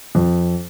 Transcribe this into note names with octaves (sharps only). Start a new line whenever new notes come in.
F2